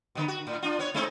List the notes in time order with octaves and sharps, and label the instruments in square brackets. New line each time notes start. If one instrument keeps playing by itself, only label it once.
[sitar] B2 D3 B3
F#4
A2
D4 F4
B3 C#5
G#3 C4 D#4